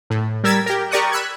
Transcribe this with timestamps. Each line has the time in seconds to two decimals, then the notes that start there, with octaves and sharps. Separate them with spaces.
0.10 A2
0.44 G3 A#4 E6 G#6 A6 B6
0.66 G4 A#4
0.91 G4 A#4 D5 C#6 D#6 F#6
1.12 B5 E6 F#6 G#6